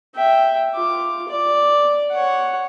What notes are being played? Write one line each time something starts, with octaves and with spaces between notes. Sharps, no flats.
E5 G5
F4 D6
D5
C#5 F#5